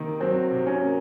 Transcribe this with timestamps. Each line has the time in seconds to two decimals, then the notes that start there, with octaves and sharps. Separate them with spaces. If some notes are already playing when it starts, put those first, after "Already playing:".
Already playing: C3 D#3 A#3
0.20 F#3 C4
0.51 C3
0.67 C#4
0.81 A#3